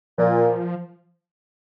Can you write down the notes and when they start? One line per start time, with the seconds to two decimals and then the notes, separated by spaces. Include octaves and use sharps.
0.18 A#2 F3